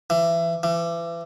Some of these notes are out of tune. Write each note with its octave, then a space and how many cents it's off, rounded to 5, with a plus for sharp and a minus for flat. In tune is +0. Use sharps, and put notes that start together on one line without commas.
E3 +25
E3 +35